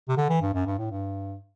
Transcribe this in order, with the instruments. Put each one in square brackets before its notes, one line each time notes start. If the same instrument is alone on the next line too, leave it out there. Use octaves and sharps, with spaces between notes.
[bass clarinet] C3
D3
E3
G2
F#2
G2
A2
G2